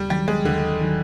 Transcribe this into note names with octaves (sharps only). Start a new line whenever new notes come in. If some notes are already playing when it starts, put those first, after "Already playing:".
Already playing: D#2 G3
D#3 F#3 G3
G#3
D#2 D3
D#3 F#3